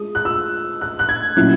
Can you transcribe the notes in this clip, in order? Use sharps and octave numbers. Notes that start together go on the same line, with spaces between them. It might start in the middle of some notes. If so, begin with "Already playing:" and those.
Already playing: G#3 D#6
F#6
E6
F#6
F#6
G#6
A#2 F#3 C#4 E4 F#6